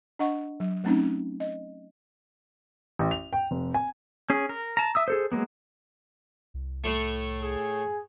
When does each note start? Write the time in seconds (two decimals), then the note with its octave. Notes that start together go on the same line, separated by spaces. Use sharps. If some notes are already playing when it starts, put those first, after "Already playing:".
0.19 D4 D#5 F#5 C#6
0.60 F#3
0.84 F#3 A3 C4 C#4 D#4
1.40 D#5
2.99 A1
3.11 F7
3.33 G5
3.51 F1
3.74 G#5
4.30 C#4 G#4
4.49 A#4
4.77 A5 A#5
4.95 E5 D#6 E6
5.08 G#4 A4 C5
5.32 F#3 G#3 A#3 B3
6.54 C2
6.84 A2 A3
7.42 G#4